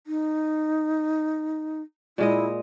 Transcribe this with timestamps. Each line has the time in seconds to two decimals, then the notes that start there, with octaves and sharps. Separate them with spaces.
0.07 D#4
2.18 A#2 G#3 E4 D#5